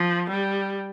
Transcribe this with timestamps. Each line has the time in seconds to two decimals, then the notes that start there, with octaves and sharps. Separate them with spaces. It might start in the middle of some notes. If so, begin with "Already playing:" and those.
Already playing: F3
0.30 G3